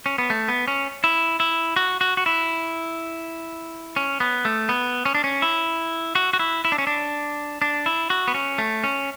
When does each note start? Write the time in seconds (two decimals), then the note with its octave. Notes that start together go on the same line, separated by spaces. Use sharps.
0.06 C#4
0.18 B3
0.30 A3
0.48 B3
0.68 C#4
1.04 E4
1.40 E4
1.76 F#4
2.01 F#4
2.17 F#4
2.26 E4
3.96 C#4
4.20 B3
4.45 A3
4.69 B3
5.05 C#4
5.15 D4
5.24 C#4
5.42 E4
6.15 F#4
6.33 F#4
6.39 E4
6.65 E4
6.72 D4
6.78 C#4
6.87 D4
7.62 D4
7.86 E4
8.10 F#4
8.28 B3
8.34 C#4
8.58 A3
8.84 C#4